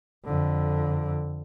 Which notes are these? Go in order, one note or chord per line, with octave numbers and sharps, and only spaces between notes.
F2 D3